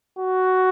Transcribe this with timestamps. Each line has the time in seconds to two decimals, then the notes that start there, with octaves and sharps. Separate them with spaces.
0.19 F#4